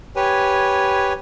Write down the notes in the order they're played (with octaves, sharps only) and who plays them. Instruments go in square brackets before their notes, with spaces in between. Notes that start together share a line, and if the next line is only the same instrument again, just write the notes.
[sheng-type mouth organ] G4 B4 C#5 G#5